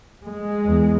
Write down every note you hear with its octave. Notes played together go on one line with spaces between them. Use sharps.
G#3
E2